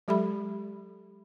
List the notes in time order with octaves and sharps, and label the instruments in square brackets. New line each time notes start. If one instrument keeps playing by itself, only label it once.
[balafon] F#3 G#3 G4 A4 E5 B5